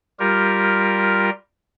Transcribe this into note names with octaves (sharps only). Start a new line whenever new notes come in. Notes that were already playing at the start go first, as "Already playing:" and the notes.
G3 F4 G4 A#4